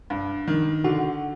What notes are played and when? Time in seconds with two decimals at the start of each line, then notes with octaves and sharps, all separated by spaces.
0.10 G2
0.47 D#3
0.84 D3 F#4